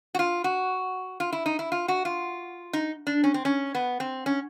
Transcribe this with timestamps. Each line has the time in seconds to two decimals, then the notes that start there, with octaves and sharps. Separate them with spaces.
0.15 F#4
0.19 F4
0.44 F#4
1.20 F4
1.32 E4
1.46 D#4
1.59 E4
1.72 F4
1.88 F#4
2.05 F4
2.73 D#4
3.07 D4
3.24 C#4
3.34 C4
3.45 C#4
3.75 B3
4.00 C4
4.26 C#4